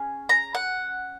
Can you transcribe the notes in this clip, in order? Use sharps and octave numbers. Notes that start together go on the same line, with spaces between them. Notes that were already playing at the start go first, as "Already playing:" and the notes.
Already playing: C#4 G#4
A#5
F#5